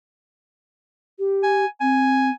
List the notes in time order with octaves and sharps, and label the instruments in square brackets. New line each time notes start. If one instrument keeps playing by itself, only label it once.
[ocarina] G4
[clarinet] G#5
[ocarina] C4 [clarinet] G#5